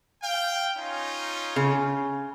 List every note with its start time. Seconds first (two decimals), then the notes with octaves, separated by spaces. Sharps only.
0.22 F5 G5
0.77 C#4 D#4 F4
1.56 C#3